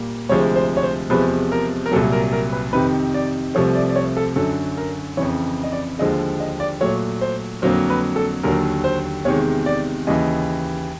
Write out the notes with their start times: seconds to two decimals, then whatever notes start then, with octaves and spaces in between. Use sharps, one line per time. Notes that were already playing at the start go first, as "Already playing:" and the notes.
Already playing: A#2 G3 A#3
0.29 D2 C3 F3 G#3 C#5
0.56 C5
0.77 C#5
0.83 C5
1.10 E2 C3 F3 G#3 B4
1.52 A#4
1.86 A#4
1.91 C2 A#2 F#3 A4
2.12 A#4
2.32 A#4
2.53 B4
2.73 F2 C3 D#3 B4
3.14 D5
3.55 C2 C3 F3 A3 C#5
3.75 D5
3.89 D5
3.96 C#5
4.17 A4
4.36 F#2 D3 F#3 A4
4.77 A#4
5.17 F2 C#3 E3 C#5
5.64 D#5
5.73 D5
5.99 D#2 D3 F3 G#3 D#5
6.40 D#5
6.60 D5
6.81 A#2 F#3 A3 C#5
7.21 C5
7.62 F2 D3 F#3 A#3 C5
7.90 B4
8.16 A4
8.43 D#2 D3 F#3 A#4
8.84 C5
9.25 E2 C3 D#3 G#3 C#5
9.66 D5
10.07 D#2 C#3 E3 D#5